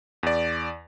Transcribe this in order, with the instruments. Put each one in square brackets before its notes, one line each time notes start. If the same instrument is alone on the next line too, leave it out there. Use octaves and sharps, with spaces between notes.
[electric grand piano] E2 D5